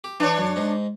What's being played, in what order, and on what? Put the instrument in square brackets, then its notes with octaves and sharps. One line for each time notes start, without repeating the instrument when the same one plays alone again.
[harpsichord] G4
[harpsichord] E3 [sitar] D4 C#5
[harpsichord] F#2
G#2 D#4